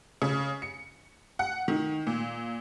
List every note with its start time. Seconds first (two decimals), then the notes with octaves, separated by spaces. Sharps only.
0.22 C#3
0.62 C#7
1.39 F#5
1.68 D#3
2.07 A#2